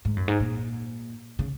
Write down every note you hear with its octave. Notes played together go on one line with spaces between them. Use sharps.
G#2
F#2
G#2
A#2
C#3